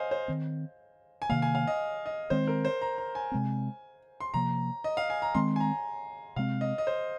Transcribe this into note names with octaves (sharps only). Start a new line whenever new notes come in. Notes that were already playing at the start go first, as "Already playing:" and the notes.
Already playing: C5 D#5 F5 G#5
C5
D#3 C4
G#5
C3 D#3 A#3 F5
G#5
F5
D#5
D#5
D#3 G#3 C4 C5
A#4
C5
A#5
A#5
G#5
C3 G#3 C4
C6
C3 F3 A#3 A#5
D#5
F5
G#5
A#5
D#3 G#3 C4 C6
G#5
A#5
C3 G#3 C4 F5
D#5
D#5
C5